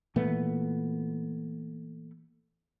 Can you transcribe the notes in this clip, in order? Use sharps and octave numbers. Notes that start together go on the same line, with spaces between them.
A#2 E3 A3 B3